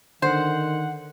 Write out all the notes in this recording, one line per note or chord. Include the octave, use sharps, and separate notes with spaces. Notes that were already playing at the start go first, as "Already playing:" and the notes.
D3 D#3 C5 F#5